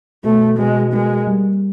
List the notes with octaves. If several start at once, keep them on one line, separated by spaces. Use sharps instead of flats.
B2 A3
B2 G#3
G#3 A#3
G3